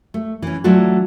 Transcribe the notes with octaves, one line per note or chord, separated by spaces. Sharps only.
A3
E3 C#4
E3 F#3 A3 D4 F4 F#4